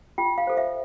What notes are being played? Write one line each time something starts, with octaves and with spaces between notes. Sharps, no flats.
F4 G5
F5
A4 C5
E5